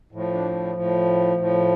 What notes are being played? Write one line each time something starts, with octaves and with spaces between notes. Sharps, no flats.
A2 F3
D4
A2 F3
A2 F3